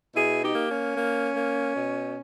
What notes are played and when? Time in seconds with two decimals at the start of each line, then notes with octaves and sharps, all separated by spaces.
0.14 B2 E4 G#4
0.42 D#4 G4
0.55 A#3
0.69 C#4
0.96 A#3
1.35 A#3
1.76 B2